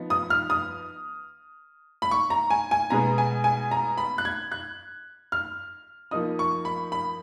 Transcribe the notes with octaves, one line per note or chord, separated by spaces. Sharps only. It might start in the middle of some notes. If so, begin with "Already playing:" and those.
Already playing: F3 B3 D#4
D#6
F6
D#6
B5
C#6
A#5
G#5
G#5
B2 G#3 B3 A#5
G#5
G#5
A#5
B5
F#6
G#6
F#6
F6
F3 A#3 D#4 D#6
C#6
B5
B5